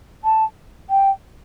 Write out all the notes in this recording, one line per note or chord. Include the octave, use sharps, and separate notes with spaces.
A5
G5